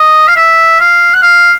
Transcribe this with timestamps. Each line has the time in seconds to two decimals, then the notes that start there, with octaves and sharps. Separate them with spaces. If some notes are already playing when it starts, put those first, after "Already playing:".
Already playing: D#5
0.28 F5
0.36 E5
0.80 F5
1.14 F#5
1.22 F5